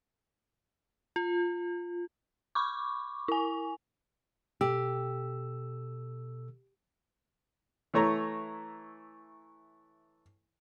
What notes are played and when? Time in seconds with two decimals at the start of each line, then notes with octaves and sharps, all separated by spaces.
1.16 F4
2.55 B5 C#6 D6
3.28 E4 G#5
4.61 B2 G4 A4 E6
7.94 E3 A3 C#5 A#5